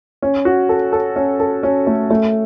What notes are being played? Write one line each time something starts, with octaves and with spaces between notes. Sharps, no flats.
C#4
F#4
A4
A4
C#4
A4
C#4
A3
A3